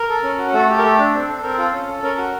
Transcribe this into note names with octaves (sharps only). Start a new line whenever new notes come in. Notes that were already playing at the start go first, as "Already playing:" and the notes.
Already playing: A#4
A4
C#4
F#4
A3 A4
G4
A#4
A3 A4
D4
C4
A4
C4 A#4
F4 A4
C#4
A4
C#4 A#4
F#4